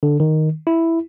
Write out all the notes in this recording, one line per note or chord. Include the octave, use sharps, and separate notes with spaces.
D3
D#3
E4